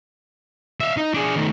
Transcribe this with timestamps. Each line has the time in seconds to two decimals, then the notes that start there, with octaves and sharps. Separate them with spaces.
0.80 E5 F5
0.97 D#4
1.14 D4 G#4
1.36 D#3 A3